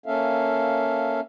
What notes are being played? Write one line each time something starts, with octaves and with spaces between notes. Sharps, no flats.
A#3 C#4 A4 E5 F5